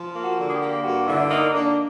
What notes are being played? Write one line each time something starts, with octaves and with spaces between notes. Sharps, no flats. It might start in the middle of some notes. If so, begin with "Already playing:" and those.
Already playing: F3
A#3
F#4
D3
G#4
G4
A#3
G2 F#4
D3 E4
A#3 D#4
A#3 D4